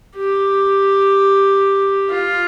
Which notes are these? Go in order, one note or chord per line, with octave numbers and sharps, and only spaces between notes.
G4
F4